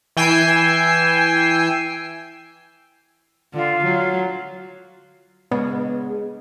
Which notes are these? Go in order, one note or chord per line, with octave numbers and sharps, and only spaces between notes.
E3 G5 G#5 E6 C7
D3 F4
F#3
C#3 G#3 B3 D4